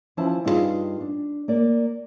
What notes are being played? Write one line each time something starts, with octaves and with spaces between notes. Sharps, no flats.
E3 F3 C#4 E4 C5 A5
G2 D#4 F4 F#4 G#4 F5
D4
A#3 D5